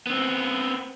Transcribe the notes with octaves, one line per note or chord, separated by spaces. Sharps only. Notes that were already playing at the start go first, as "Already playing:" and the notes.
B3 C4